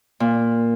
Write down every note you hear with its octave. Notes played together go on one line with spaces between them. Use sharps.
A#2